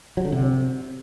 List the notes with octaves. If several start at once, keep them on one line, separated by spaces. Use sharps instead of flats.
F#3
D3
C3